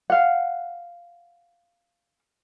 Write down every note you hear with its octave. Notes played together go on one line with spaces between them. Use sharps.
F5 F#5